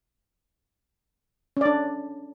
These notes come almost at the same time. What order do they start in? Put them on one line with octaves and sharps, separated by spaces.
C#4 D5 D4